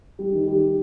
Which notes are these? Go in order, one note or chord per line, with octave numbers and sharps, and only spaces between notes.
G3
D#3
G3